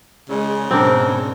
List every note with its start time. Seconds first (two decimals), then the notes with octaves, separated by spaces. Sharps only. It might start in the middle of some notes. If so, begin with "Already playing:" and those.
0.29 C#3 G#3
0.71 G#2 B2 C4 D4 A#4